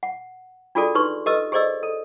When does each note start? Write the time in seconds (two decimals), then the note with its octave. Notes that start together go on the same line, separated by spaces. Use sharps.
0.03 F#5
0.75 D4 F4 F#4 G#4 A4 D5
0.95 D#4 G4 B4 C6 C#6
1.26 G4 A4 B4 D#5 E6
1.52 G4 G#4 C5 D5 D#5 E6
1.83 A4